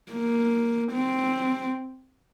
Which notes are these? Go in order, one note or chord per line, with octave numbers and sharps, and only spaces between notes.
A#3
C4